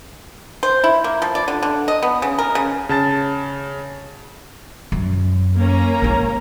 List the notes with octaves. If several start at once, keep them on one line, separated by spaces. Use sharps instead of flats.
C5
E4
A#3
F3
D5
D3
D3
D#5
B3
C#3
A#4
C#3
C#3 A5 A6
F#2
A#3 C#4 A#5
G#3 E4